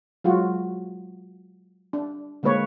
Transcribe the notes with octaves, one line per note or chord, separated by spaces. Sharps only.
F#3 G#3 F4 F#4
D4
D3 G#3 A#3 B4 C#5